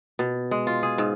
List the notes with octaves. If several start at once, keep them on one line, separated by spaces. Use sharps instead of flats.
B2
G#3
F4
G#4
G#2